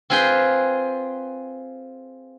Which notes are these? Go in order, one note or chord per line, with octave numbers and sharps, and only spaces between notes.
C4 F4 G#4 B4 G5